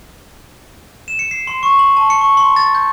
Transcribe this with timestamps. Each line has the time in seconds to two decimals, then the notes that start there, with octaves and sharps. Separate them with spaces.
1.08 E7
1.19 C#7
1.31 C7
1.47 C6
1.63 C#6
1.79 F#7
1.97 A5
2.10 C#7
2.21 C#6
2.37 C6
2.56 A6
2.75 G6